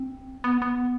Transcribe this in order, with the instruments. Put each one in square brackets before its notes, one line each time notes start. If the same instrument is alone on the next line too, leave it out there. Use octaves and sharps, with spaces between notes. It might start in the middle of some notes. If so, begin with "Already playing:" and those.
Already playing: [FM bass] C4
B3
B3